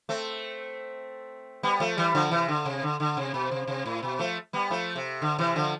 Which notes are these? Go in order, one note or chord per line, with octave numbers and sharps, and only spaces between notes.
A3 C4
G3 B3
F3 A3
E3 G3
D3 F3
C3 E3
D3
C3
D3
D3
C3
B2
C3
C3
A2
B2
F3 A3
G3 B3
F3 A3
C3
D3
C3 E3
D3 F3